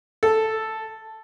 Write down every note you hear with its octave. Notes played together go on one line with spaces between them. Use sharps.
A4